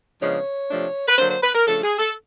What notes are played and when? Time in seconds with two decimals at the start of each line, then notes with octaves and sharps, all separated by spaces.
0.21 C#3 F3 G#3 B3 D4 C#5
0.70 C3 F3 A3 D4
1.08 B4
1.18 D3 F#3 A#3 D4 C5
1.30 C5
1.43 B4
1.55 A#4
1.66 C#3 F3 A3 D4 A4
1.83 G#4
1.99 A4